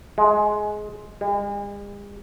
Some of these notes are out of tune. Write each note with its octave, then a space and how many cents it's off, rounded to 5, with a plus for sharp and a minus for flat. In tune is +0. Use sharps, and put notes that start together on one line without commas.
G#3 +15
G#3 -45